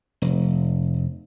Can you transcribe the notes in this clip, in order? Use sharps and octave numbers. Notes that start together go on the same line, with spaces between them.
F1